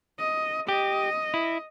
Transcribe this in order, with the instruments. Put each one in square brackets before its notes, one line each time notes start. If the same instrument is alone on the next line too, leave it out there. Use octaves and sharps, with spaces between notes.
[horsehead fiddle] D#5
[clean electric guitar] G4 [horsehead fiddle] D#5
[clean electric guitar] E4